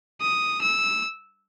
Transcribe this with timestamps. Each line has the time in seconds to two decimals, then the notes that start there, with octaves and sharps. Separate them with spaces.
0.22 D#6
0.62 E6